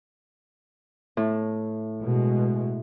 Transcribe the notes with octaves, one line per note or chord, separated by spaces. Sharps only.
A2
B2 G#3